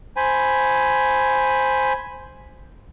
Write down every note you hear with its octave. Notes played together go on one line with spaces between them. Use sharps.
C5 G#5 B5